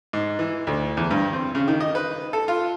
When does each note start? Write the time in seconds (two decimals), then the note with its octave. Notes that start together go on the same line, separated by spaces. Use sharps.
0.13 G#2
0.39 E3
0.67 D2
0.97 E2
1.11 G2
1.33 C4
1.55 C#3
1.68 D#3
1.80 D#5
1.95 B4
2.33 A4
2.48 F4